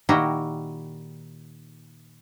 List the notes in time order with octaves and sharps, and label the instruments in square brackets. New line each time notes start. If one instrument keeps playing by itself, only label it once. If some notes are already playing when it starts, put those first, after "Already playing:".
[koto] A#2 D#3 E4 F#4 G4 A#5